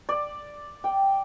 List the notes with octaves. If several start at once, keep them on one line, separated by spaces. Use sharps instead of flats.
D5
G5